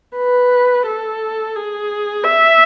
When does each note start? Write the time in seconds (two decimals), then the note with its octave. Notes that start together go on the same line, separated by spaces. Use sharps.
0.17 B4
0.86 A4
1.55 G#4
2.25 E5